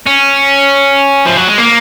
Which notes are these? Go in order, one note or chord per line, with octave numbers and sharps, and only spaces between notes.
C#4
F3
F#3
G#3
A#3